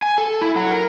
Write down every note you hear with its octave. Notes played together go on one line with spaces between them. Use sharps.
G#5
A4
E4
F#3
A#4